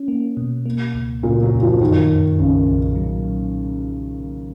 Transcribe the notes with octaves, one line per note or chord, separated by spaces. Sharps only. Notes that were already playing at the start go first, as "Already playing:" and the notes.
Already playing: C#4
A#3
B2
A#3
C#2
A#2 C#3
F#3
F2
F3
F#2 D#3
F#2
B1 C#3
B1
F#3